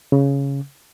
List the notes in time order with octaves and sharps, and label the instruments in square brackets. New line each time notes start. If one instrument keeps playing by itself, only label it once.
[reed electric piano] C#3